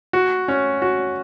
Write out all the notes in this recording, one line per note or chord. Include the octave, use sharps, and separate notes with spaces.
F#4
C#4
F#4